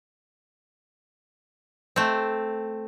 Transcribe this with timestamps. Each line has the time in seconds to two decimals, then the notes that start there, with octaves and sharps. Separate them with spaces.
1.96 A3 C4